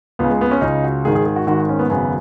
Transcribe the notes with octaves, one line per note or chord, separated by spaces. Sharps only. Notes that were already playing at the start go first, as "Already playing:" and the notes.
C#2 C#3 B3
G#3
B3
C#4
C#2 C#3 D#4
F#4
G#1 G#2 D#3 G#4
G#4
G#4
F#4
G#1 G#2 D#3 F#4
C#4
B3
G#1 F#2 C#3 B3